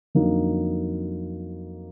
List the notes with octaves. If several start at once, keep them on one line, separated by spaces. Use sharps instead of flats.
F2 D3 F#3 A#3 D#4